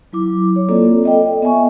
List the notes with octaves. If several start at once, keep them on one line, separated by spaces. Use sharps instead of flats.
F#3 E4 D6
C#5
A#3 C4 F4 A4 D5
A4 D#5 G5
B3 E5 G#5 C#6